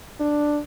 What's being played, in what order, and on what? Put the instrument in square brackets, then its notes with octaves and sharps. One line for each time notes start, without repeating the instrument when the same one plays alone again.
[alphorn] D4